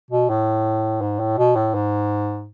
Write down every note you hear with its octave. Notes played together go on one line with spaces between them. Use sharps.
B2
A2
G#2
A2
B2
A2
G#2